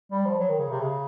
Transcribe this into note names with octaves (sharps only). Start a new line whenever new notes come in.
G3
F3
F#3
D#3
C#3
C3
C#3